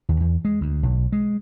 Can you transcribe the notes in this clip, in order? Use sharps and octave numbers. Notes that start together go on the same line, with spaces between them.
D#2
E2
G#3
D2
B1
G#3